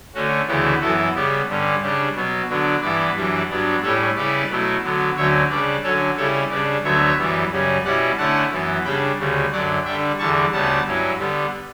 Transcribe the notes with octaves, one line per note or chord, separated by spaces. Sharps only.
D3 A3 C#4 F#4
D2 C#3 E3 B3 E4 G4
F#2 E3 B3 E4 F#4 A4
C#3 G3 B3 G4
G2 D3 G3 C#4
C#3 G3 D4 G4
B2 F#3 B3
D3 F#3 B3 D4
G2 E3 B3 E4 B4 D5
F#2 E3 G3 D4
G2 F#3 B3 D4
A2 G3 C#4 E4 A4 C#5
C#3 G3 C#4 E4 B4 D5
B2 F#3 A3 E4
D3 F#3 B3
D2 D3 F#3 C#4 C#5 E5
C#3 G3 D4 B4 D5
D3 F#3 C#4 A4 C#5
C#3 G3 C#4 E4 A4 C#5
C#3 G3 D4 B4 D5
D2 D3 F#3 B3 C#5 E5
F#2 E3 G3 B3
F#2 C#3 G3 C#4
B2 G3 C#4 E4 D5 F#5
D3 A3 C#4 E4 F#5 A5
F#2 E3 B3
C#3 G3 D4 G5 B5
D2 C#3 G3
F#2 D3 F#3 D5 F#5
D3 G3 D4 E5 G5
E2 D3 G3 A5 C#6
D2 C#3 G3 B3 F#5 A5
G2 F#3 C#4 E4
D3 G3 B3